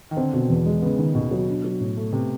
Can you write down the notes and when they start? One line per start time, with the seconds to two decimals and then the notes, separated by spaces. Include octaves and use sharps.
0.11 D#3
0.17 D3 C4
0.34 B2
0.49 E2
0.66 G#3
0.82 C#3 B3
0.98 D#3
1.15 D#2 B2
1.31 F#3
1.48 D4
1.64 F#3
1.80 A2
1.97 A3
2.13 C3 B3